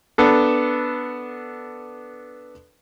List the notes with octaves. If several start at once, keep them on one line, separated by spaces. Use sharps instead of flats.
B3 D4 A4